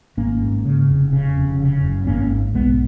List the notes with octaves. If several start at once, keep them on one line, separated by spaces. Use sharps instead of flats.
G#1 A#3 C#4
G#2
C#3
F1
C#3
F1
C#3
F#1
G#1 A#3 C#4
G#2
B1 G#3 B3